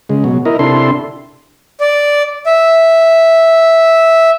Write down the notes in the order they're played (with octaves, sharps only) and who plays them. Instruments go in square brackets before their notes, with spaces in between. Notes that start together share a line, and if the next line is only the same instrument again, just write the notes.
[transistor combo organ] C#3 G#3
B2 F#3
E4 A#4 D#5
C3 D4 E4 A4 C6
[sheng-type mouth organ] D5
E5